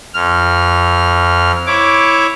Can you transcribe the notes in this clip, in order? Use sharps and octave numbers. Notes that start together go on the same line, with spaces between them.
F2 F6
E4 C#5 D6